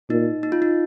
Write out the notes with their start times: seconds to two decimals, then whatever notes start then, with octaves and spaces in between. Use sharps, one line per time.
0.10 A#2 D#4
0.43 D#4
0.52 F4
0.62 D#4